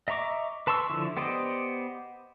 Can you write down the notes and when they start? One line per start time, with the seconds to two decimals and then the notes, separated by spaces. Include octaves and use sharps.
0.08 D#5 E5 A#5 C#6 D6
0.67 B4 A5 C6 C#6 E6
0.90 D3 F3 E4
1.17 B3 G4 C5 D5 D#5